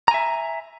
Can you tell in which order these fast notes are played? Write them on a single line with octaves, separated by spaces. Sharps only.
A#5 G#5 E5